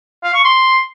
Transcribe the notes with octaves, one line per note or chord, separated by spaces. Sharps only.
F5
C#6
C6